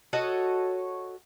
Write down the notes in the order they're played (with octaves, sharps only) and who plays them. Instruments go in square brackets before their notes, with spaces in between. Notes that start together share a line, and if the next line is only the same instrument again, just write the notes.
[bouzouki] F#4 A4 C#5 D#5